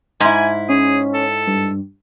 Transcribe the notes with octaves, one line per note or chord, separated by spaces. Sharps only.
G#2 E4 G#5
C#4 G#4
A4
G2